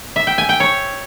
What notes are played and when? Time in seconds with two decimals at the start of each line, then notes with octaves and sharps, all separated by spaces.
0.16 E5
0.27 G5
0.38 G#5
0.49 G5
0.60 C#5